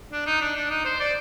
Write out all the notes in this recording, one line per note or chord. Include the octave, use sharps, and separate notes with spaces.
D4
D#4
D4
D4
D#4
C5
D5